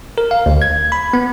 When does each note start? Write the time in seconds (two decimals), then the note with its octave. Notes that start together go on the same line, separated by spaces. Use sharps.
0.18 A#4
0.31 F5
0.46 D2
0.62 G#6
0.92 B5
1.13 B3